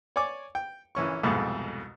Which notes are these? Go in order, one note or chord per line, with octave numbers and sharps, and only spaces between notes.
C#5 D5 G#5 D6
G5
A#1 E3 C#4 C#6
C2 F2 G#2 B2 A3